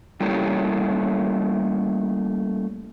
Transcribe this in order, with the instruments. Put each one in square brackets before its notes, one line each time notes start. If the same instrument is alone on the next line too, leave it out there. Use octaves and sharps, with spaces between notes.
[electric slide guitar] G3 A3 A#3 C#4 E4 G4